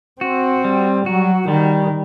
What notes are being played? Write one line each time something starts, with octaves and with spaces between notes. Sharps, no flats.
C4 F#4
G3
F#3 F#4
D#3 G3